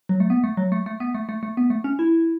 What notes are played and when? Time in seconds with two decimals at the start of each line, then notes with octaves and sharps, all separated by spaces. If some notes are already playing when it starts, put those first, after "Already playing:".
0.09 F#3
0.20 A3
0.30 B3
0.44 A3
0.57 F#3
0.72 A3
0.86 A3
1.00 B3
1.14 A3
1.29 A3
1.43 A3
1.57 B3
1.70 A3
1.84 C#4
1.99 E4